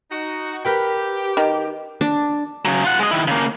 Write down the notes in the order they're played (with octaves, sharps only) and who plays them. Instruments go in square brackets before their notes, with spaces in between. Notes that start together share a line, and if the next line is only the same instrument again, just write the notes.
[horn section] D#4 F#4
[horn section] G4 [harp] A#4 B4 G5
[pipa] D#3
[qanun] D4
[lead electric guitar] C#3 F#3
F4 F#5
G#3 D#5
D#3 E4
C#3 A#3